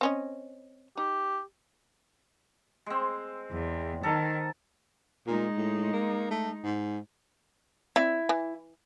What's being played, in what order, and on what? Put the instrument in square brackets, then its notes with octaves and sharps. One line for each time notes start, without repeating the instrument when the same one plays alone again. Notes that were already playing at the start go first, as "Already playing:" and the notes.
[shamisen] C4 C#4 D#5
[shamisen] D#4 [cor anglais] G4
[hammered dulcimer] G#3 C4
[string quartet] E2
[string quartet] D#3 [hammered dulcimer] A4 A#4
[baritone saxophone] A#2 [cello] G#3 D#4
[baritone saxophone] A2
A#3
A3
G#2
[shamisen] C4 D5 [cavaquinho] E4
[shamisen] E3